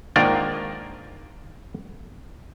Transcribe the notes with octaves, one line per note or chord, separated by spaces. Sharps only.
G#2 D#3 A#3 D4 F4 D5